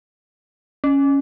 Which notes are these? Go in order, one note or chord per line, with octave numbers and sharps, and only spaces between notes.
C#4